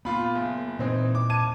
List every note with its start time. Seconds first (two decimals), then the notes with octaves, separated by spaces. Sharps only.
0.05 A#2 B3 F4 B5
0.35 F#1
0.79 A#2 E3 C4 D#4
1.15 D6
1.30 A5 G#6 D#7